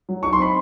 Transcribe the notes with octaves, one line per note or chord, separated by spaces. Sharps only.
F#3
D#4 C#6
C6
C4 B5